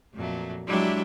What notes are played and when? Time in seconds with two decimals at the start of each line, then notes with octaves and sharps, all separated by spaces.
0.15 F2 A#2 F#3 A3
0.67 F#3 G#3 D4 E4 G4 E5